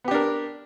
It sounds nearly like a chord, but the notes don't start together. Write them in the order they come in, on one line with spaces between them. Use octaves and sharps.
B3 G4 D4 A#4